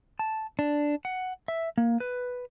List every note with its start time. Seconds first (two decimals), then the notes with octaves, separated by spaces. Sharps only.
0.19 A5
0.59 D4
1.05 F#5
1.48 E5
1.78 A#3
2.00 B4